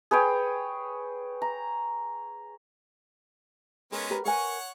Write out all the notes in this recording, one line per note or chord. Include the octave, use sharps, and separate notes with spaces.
G#4 B4 C#5 G5
A#5
G#3 B3 C#4 A#4
G4 A#4 B4
A#4 B4 C#5 F#5 G#5 C#6